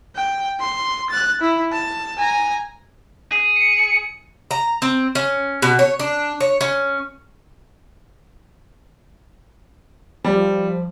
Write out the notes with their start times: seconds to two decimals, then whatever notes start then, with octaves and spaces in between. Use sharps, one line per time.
0.16 G5
0.60 C6
1.10 F#6 A6
1.42 E4
1.73 A5
2.18 G#5 A#5
3.32 G#4
3.56 C#7
4.51 A#5
4.82 C4
5.15 C#4
5.62 B2
5.79 C#5
5.99 D4
6.41 C#5
6.61 C#4
10.25 F3 G3